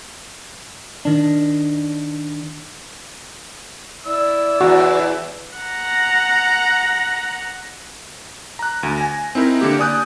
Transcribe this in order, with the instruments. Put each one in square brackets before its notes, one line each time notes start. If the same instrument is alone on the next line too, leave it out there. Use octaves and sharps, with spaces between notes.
[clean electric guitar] D#3 D4
[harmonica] E4 E6 [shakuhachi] D5
[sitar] E2 [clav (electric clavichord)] F#4
[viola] F#5 A#5
[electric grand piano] A#5 F#6
D2
G#5 A#6
C4 D#4 E4 A#4
D3 A#3 G4
D5 G#5 D#6 F#6 G6